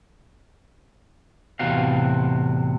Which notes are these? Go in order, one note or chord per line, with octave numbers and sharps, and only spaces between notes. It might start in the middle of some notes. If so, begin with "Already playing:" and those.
E2 A2 C3 F#4 F5